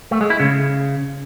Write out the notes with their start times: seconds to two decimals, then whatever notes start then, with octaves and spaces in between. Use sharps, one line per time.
0.11 A3
0.21 G#3
0.30 E4
0.40 C#3